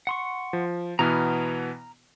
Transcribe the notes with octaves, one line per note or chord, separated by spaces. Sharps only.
F#5 C6 C#6
F3
B2 E3 B3 A#5 F6